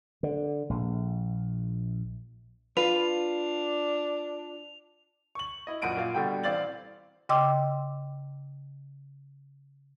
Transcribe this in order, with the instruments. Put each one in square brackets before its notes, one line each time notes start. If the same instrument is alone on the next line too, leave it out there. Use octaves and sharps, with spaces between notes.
[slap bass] D3
A#1
[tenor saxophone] D4 [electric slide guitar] F4 F5 [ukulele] B4 [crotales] F7
[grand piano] C#6 F#7
E4 D#5
A#1 F#2 F#5 D7 D#7
A#2 F5
B2 D3 G3 G5
A1 C4 D5 F5 A6 F#7
[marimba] C#3 D#5 G5 C6 D6 E6